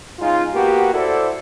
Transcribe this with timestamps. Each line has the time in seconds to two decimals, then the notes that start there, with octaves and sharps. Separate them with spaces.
0.19 C#3 G#3 D#4 F4
0.53 A#3 B3 F#4 G4
0.94 E4 F#4 A4 C5 D5